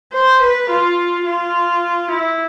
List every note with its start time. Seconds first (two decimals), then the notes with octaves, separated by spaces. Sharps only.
0.13 C5
0.42 B4
0.70 F4
1.26 F4
2.11 E4